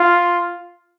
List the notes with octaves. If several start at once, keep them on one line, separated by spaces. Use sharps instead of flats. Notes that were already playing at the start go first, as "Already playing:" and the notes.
Already playing: F4